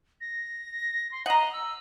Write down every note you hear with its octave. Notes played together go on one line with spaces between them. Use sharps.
A#6
C6
D#5 F#5 A#5
E6